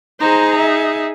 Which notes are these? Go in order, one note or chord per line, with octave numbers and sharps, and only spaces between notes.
D#4 G#4 C5 A#5
E5